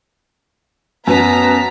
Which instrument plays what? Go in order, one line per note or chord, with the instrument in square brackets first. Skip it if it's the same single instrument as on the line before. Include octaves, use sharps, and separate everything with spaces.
[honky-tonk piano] F#2 [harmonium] B3 [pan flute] B4 [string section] A5 A#5 B6